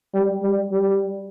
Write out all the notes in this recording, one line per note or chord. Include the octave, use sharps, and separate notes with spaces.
G3
G3
G3